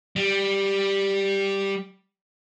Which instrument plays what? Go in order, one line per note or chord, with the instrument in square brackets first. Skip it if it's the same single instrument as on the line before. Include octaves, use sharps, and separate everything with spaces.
[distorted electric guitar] G3